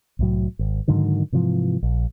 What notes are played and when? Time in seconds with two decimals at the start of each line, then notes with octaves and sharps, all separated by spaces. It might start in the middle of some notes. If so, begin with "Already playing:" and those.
0.19 C2 A2 F#3
0.59 G#1
0.88 G#2 D3 D#3 F#3
1.32 G#2 C3 E3 F3
1.83 A#1